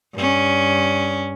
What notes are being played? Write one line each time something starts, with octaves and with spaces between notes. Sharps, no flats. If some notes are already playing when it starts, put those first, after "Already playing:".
G2 C#4